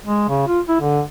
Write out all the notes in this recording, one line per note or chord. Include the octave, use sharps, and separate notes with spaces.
G#3
C#3
F4
E4
D3